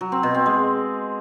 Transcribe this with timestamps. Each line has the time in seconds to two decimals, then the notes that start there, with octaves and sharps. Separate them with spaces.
0.01 F#3
0.12 C4
0.23 B2
0.34 C4
0.46 G#3